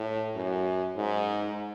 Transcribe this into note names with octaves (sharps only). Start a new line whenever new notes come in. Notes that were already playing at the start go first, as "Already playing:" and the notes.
Already playing: A2
F#2
G#2